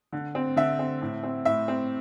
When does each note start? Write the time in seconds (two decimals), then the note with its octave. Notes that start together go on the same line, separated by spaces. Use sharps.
0.13 D3
0.35 C4
0.56 D3 E5
0.79 C4
1.01 A2
1.23 C4
1.45 A2 E5
1.68 C4